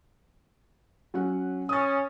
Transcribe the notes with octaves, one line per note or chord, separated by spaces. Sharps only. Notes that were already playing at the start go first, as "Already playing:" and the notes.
F#3 C#4 F#5
C#4 D#6 A6